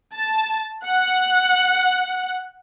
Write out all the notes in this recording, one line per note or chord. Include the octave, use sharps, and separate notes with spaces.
A5
F#5